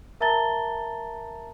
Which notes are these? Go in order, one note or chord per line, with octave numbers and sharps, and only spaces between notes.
A#4 E5 A5 A#5 A6 G7